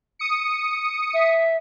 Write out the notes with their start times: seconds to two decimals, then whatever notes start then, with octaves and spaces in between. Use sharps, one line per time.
0.19 D#6 C#7
1.14 E5